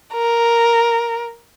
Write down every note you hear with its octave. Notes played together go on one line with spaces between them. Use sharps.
A#4